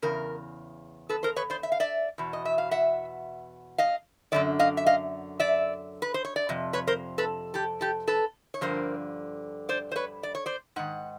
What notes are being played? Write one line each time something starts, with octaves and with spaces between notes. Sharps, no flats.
E2 C#3 A#4
A4 B4
A#4 C5
B4 C#5
C5 D5
E5
F5
D5 E5
E2 B2
D#5
E5
F5
E5 F#5
D#5 F5
F#2 D3 F3 D5 E5
D#5 F5
E5
D#5 F5
D5 E5
B4
C5
C#5
D5
F2 C3
B4 C#5
A#4 C5
A4 B4
G4 A4
G4 A4
A4 B4
C#5
G2 D3 F3 A#4 C5
C5 D5
C5
B4 C#5
D5
C#5
C5 D5
G#2 D#3 F#5